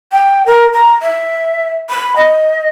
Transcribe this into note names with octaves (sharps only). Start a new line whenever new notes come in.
G5
A#4
A#5
E5
B5
D#5